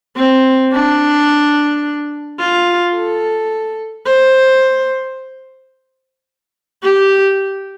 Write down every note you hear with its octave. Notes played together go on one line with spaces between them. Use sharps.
C4
D4
F4
A4
C5
G4